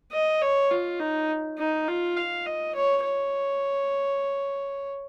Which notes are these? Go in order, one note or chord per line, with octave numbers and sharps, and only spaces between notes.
D#5
C#5
F4
D#4
D#4
F4
F5
D#5
C#5
C#5